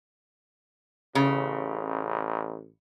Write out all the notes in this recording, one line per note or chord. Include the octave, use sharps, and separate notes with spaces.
A1 C#3